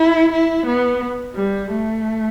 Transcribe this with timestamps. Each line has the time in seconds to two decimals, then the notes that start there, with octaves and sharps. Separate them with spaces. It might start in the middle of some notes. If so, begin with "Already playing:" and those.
Already playing: E4
0.32 E4
0.66 B3
1.36 G3
1.71 A3